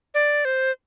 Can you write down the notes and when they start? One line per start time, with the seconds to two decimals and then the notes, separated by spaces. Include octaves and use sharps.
0.14 D5
0.45 C5